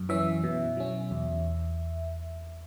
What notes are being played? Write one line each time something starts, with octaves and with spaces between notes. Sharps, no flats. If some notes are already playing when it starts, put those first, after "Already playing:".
Already playing: F#2
E3 C#4 E5
B2
F#3 C#4
E2